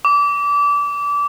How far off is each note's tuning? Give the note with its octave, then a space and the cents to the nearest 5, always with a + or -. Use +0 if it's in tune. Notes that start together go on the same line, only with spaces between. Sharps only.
D6 -25